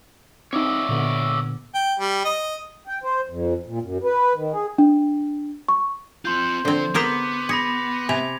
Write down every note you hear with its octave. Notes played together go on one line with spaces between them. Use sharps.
C4 D#4 C#5 D5 E5
A#2 D3 B3
G5
G3
D#5
G5
C5
F2
A#2
F#2
B4
D#3
G#4
D4
C#6
C4 F4 C6 G6
D3 F3 C4 C5
B3 G#4 A#4 C5 D6 B6
G#4 B5 A#6 C#7
C3 G#5 G#6 F7